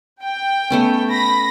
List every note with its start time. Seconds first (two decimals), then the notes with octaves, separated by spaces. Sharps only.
0.22 G5
0.70 A3 B3 C#4
1.10 B5 A#6